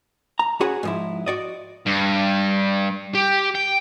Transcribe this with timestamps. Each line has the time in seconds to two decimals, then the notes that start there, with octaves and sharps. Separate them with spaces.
0.39 A#5
0.60 C#4 F#4 G#4 B4 F#5
0.83 G#2 F3 E4
1.26 F#4 D5 D#5
1.86 G2
3.15 G4
3.55 G5